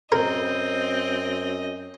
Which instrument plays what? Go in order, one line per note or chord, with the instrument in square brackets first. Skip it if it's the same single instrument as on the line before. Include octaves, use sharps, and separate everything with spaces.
[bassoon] F#2 [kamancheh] C4 [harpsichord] A#4 [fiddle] D#5